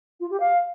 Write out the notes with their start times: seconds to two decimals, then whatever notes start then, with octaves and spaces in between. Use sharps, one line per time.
0.20 F4
0.30 G4
0.40 F5